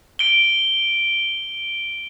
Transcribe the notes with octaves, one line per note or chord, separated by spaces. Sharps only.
D7 G7